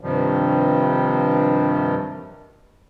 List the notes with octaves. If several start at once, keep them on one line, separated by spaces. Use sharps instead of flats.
G2 C3 D#3 F3 G3